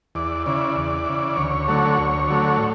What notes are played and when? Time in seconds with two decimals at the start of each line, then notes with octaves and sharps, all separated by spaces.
0.15 E2 D5
0.46 C#3 E3 D5
0.76 E2
1.06 C#3 E3
1.37 D2 C#5
1.68 D3 F#3 A3
1.98 D2
2.28 D3 F#3 A3
2.58 A2